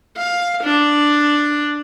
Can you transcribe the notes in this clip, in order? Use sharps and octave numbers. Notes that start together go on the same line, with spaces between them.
F5
D4